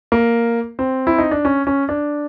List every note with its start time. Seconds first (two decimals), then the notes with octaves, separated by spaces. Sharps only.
0.12 A#3
0.79 C4
1.07 E4
1.18 D#4
1.31 D4
1.45 C#4
1.67 C#4
1.89 D4